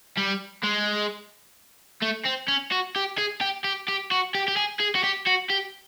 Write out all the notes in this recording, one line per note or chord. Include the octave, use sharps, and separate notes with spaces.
G3
G#3
A3
C4
C#4
F#4
G4
G#4
G4
G4
G4
F#4
G4
G4
G#4
G#4
F#4
G4
F#4
G4